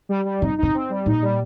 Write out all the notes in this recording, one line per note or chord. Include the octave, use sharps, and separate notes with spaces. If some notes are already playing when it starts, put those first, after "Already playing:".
G3
G3
C3 D#4
C3 D#4
C4
G3
A#2 D#4
G3